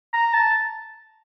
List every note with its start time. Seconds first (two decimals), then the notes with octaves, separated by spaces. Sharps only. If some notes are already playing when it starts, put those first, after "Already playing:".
0.13 A#5
0.34 A5